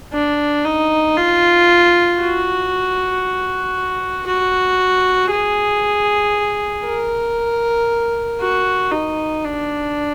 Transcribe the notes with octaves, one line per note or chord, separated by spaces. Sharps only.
D4
D#4
F4
F#4
F#4
G#4
A#4
F#4
D#4
D4